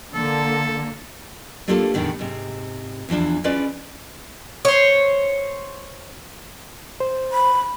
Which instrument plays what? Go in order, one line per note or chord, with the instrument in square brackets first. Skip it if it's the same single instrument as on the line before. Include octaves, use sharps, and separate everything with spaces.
[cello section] D3 A#3 [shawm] A4
[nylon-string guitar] A3 A#3 D4 F4 G4 A4
E2 A2 D3 D#3 B3
G#2 C3
E2 E3 F3 D4
C#4 E4 F4 G#4 B4 D5
[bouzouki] C5 C#5
[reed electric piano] C5
[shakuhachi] B5